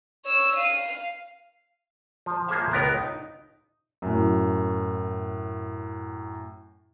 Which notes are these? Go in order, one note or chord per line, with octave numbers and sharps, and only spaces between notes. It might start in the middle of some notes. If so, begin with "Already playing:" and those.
C#5 E6
F5 D#7
F3
F3 A#3 G#4 C#5 E5 F5
C#2 B3 A#4
D#4
F#2 A2